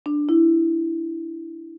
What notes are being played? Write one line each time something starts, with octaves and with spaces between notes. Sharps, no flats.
D4
E4